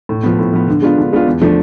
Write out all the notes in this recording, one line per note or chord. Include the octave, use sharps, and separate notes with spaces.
A2
F3 B3
A2
F3 B3
D3
G#3 B3 D4 F4
D3
G#3 B3 D4 F4
E2
D3 F3 A3 D4